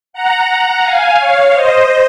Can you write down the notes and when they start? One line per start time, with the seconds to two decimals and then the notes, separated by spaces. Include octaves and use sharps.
0.13 F#5 A#5
0.83 F5 G#5
1.18 C#5 F5
1.53 C5 D#5